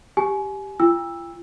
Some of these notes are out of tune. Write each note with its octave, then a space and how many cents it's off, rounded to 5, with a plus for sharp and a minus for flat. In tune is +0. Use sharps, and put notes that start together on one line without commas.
G4 +0 G#5 +25
F4 -40 G5 +40 E6 +0